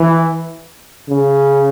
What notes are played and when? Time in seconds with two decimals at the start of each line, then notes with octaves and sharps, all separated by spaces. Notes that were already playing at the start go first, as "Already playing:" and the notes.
Already playing: E3
1.09 C#3